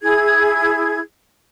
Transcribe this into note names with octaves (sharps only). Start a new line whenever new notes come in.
E4 G#4 G#6